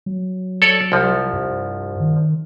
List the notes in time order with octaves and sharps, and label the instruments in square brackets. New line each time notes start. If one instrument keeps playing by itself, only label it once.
[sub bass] F#3
[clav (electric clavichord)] A4 C#5 D5
C2 F3
[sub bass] G2
D#3